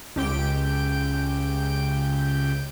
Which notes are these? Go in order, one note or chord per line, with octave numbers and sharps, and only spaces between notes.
C#2 G4 G5 D7